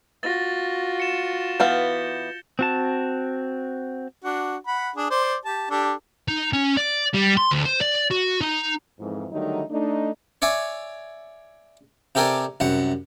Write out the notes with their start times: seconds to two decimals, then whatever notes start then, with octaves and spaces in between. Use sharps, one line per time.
0.23 F4 F#4 A6 A#6
1.00 C#7 E7
1.60 E3 B3 F5 G6 G7
2.59 C4 F#4 A5
4.24 D4 F#4
4.67 F#5 B5
4.96 D4 G#4
5.10 C5 D5
5.45 G4 A5
5.71 D4 G4 A4
6.28 D#4
6.53 C#4
6.77 D5
7.14 G3
7.37 C6
7.51 D2
7.66 C5
7.81 D5
8.11 F#4
8.41 D#4
9.00 F2 G#2 E3
9.31 D3 D#3 F#3 G3 A3 D#4
9.71 A3 D4 D#4
10.42 C#5 D5 E5 G#5
12.15 C3 G4 A4 A#4 D5 G#5
12.60 C2 F#2 F#5